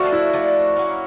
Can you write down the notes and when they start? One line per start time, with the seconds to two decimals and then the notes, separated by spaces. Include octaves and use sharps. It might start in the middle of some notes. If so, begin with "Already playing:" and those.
Already playing: F3 A3 D4 F#4
0.13 E4
0.33 F3 A3 D4
0.76 F#3 A#3 C#4